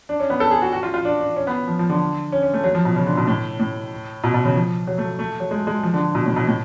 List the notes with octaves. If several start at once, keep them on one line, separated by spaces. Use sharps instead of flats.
D4
C#4
B3
A4
G#4
F#4
F#4
F4
F4
D4
D4
C#4
B3
F3
F3
D3
C#4
C#4
A3
F#3
F3
B2
C#3
D3
B2
A2
A2
B2
B2
C#3
F3
F#3
A3
A3
F#3
G#3
G#3
F3
D3
B2
A2
B2
A2